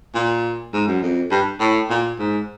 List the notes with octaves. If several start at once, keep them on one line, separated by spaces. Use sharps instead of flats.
A#2
G#2
F#2
F2
G2
A2
A#2
G#2